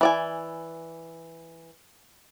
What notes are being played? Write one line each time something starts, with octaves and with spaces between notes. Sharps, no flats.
E3 D5 G#5